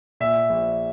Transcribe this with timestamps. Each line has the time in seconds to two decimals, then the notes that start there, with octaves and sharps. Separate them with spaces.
0.20 A#2 E5
0.50 A#1